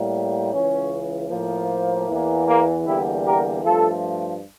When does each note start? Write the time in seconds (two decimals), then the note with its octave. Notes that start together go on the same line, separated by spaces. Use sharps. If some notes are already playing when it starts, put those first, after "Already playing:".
Already playing: A2 G3 A#3
0.52 C#2 C#3 E3 C#4
1.30 A2 F3 A#3
2.09 E2 E3 A#3
2.47 A#3
2.86 E2 D3 G3 A#3 E4 G4
3.25 G4 A#4
3.64 G2 F3 A3 F4 A4